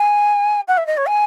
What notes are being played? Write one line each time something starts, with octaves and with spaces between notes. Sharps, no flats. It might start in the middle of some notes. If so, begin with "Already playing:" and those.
Already playing: G#5
F#5
E5
D#5
C#5
G#5